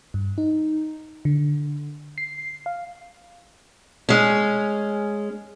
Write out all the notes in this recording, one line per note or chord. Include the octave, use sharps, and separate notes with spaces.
G2
D#4
D3
C7
F5
G#3 C#4